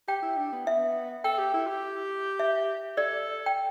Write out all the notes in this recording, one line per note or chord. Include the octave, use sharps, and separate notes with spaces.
G4 G5
E4
D4
B3
B3 E5
A4 G5
G4
E4
G4
E5
A4 D5
G5